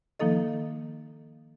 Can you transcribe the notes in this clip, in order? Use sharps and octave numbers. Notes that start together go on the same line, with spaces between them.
D#3 F3 A#3 D#4 A4 D#5